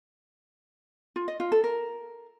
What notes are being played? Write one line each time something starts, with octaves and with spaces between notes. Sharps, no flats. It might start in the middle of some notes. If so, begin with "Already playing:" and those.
F4
D#5
F4
A4
A#4